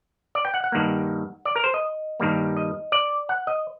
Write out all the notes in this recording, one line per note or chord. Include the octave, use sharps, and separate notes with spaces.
D5
G5
F#5
F#5
G2 D#3 G3 A#3
D5
A#4
C5
D#5
G2 D#3 G3 A#3
D#5
D5
F#5
D#5